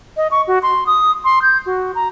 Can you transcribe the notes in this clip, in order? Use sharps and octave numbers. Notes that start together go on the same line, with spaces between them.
D#5
C#6
F#4
C6
D#6
C6
G6
F#4
A#5